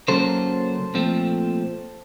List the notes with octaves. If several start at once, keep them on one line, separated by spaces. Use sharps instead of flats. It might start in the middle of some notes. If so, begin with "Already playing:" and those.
C#3 F#3 A#3 C#4 A4 C5
A#2 F3 A3 C4